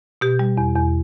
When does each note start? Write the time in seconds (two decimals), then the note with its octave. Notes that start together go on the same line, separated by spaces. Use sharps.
0.21 B2 G4
0.39 G3
0.57 E2
0.76 E2